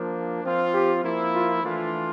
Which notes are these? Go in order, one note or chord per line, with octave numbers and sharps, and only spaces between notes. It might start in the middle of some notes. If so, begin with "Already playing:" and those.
Already playing: F3 A#3 D4
F3 C4 F4
G4
F3 A#3 E4
F4
E3 A3 D4 F4